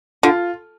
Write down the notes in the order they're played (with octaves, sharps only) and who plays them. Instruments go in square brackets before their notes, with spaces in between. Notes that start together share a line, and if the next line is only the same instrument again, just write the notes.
[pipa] D3 [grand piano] F4